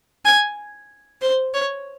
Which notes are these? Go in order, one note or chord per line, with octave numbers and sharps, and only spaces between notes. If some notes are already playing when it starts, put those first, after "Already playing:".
G#5
C5
C#5